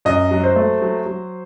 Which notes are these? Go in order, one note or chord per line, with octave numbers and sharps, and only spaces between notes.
F#2 D#5
F#3
C5
A3
F#3
F#3